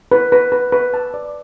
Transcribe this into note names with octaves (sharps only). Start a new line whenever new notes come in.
B4
B4
B4
B4
A5
D5